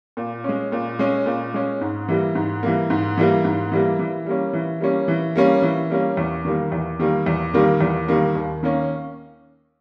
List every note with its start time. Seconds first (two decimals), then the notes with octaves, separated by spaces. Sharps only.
0.17 A#2
0.44 G#3 C#4
0.72 A#2
0.99 G#3 C#4
1.26 A#2
1.54 G#3 C#4
1.81 G#2
2.08 E3 G3 A#3
2.35 G#2
2.63 E3 G3 A#3
2.90 G#2
3.18 E3 G3 A#3
3.45 G#2
3.72 E3 G3 A#3
3.99 E3
4.26 G3 A#3 C#4
4.53 E3
4.80 G3 A#3 C#4
5.08 E3
5.36 G3 A#3 C#4
5.62 E3
5.90 G3 A#3 C#4
6.17 E2
6.45 D#3 G3 A#3
6.72 E2
6.99 D#3 G3 A#3
7.26 E2
7.54 D#3 G3 A#3
7.81 E2
8.08 D#3 G3 A#3
8.35 D#2
8.63 D#3 A#3 C#4